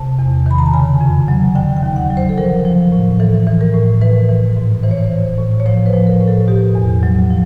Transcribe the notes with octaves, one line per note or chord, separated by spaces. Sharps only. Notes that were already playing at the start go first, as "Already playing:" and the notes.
Already playing: C3 A5
E2
D#3 B5
A#5
A5
C#3 G#5
F2
F#3
D3 G5
G5
D#2
F#5
F#3
C5
A4
F3 A#4
F3
A2
E3 A4
E3
A#4
A2
E3 B4
E3
G#2
E3 C5
C#5
C5
E3
A2
C#5
F3 C5
B4
F3
A#4
A2
A4
B2 G4
E2
F#3
F3